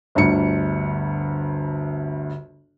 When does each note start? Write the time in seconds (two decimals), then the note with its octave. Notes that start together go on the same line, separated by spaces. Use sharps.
0.15 G1 D2 C#7